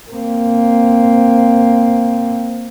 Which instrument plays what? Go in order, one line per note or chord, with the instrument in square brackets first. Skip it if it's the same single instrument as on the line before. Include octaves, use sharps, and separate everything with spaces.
[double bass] A#3 C4